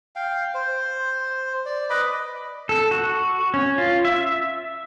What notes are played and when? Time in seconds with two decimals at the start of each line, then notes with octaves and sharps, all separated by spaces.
0.16 F5 G5
0.54 C5
1.66 D5
1.90 B4 D#5 B5 D6
2.69 A4
2.91 F#4
3.54 C#4
3.78 F4
4.05 E5